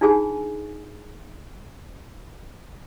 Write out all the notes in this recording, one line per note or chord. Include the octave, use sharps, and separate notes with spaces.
D4 D#4 F4 G#4 G#5